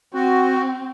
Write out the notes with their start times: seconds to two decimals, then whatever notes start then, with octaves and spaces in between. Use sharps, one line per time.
0.14 C4 F#4